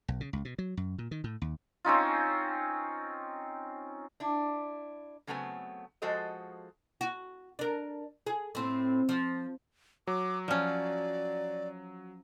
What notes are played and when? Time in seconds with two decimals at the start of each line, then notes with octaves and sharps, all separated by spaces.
0.08 B1
0.21 C#3
0.33 C#2
0.45 B2
0.59 F#3
0.77 F#2
0.98 A#2
1.11 D#3
1.24 A2
1.42 D#2
1.85 C4 C#4 D#4 F4
4.20 D4 E4
5.27 C#3 F#3 A3 B3 C4 G#5
6.02 F3 G#3 F#4 A4 C5 D#5
7.01 F#4
7.59 D4 A#4
8.27 G#4
8.55 A2 C4
9.09 F3
10.07 F#3 D6
10.48 F3 C#4 D5